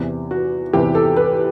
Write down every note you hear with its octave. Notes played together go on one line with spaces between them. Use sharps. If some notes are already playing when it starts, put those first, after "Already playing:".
Already playing: E2 C3 E3
F#4
E2 C3 E3 G4
A4
B4